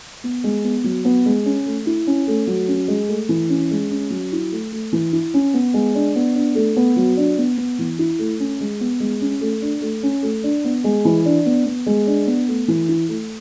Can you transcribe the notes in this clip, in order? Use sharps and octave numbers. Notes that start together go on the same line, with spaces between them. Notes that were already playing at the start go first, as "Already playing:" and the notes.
B3
G#3
B3
F#3
B3
G#3
C#4
A3
E4
C#4
A3
F#3
C#4
G#3
A3
E3
C#4
G#3
C#4
F#3
E4
A3
A3
E3
E4
C#4
B3
G#3
D4
B3
D4
A3
B3
F#3
D4
B3
B3
E3
E4
A3
C#4
G#3
B3
G#3
C#4
A3
D4
A3
C#4
A3
D4
B3
G#3
E3
D4
B3
B3
G#3
D4
B3
A3
E3
E4
A3